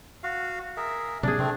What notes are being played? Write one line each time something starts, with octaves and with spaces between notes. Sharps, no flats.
F#4 F5
G#4 A#4 E5
C3 A#3 C4 D4 G#4
C3 A3 C4